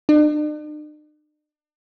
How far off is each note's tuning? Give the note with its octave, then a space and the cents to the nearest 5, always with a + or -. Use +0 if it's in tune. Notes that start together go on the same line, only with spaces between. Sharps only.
D4 +45